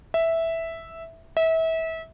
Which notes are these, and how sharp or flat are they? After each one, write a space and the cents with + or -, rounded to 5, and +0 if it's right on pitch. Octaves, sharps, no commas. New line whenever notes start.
E5 -5
E5 -30